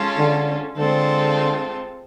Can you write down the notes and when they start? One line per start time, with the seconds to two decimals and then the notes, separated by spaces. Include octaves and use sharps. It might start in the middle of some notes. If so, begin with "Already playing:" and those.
Already playing: G#3 C#4 F4 A4
0.18 D3
0.77 D3 G#3 C4 F4 A4